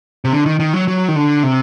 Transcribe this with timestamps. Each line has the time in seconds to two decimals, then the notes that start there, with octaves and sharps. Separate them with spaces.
0.25 C3
0.33 D3
0.46 D#3
0.60 D#3
0.73 F#3
0.88 F#3
1.08 D#3
1.16 D3
1.43 C3